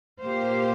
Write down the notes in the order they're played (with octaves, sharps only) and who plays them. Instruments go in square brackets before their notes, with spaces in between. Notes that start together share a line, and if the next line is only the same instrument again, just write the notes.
[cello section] A#2 A#3 G4 C5 F5